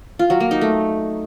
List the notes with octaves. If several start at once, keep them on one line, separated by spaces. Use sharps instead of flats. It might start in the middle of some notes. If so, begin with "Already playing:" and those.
F4
F#3
A#3
D#4
A3